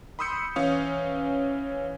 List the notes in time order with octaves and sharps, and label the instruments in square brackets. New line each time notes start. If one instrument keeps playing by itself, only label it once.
[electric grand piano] B5 C6 D#6 E6 G6 C#7
E3 C#4 F5 D#6